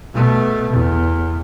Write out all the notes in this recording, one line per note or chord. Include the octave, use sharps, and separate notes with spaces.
B2 A3
E2